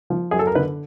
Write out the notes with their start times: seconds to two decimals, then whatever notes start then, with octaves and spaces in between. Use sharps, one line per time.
0.10 F3
0.31 F#2 G#4
0.39 A4
0.47 A#4
0.55 D3 B4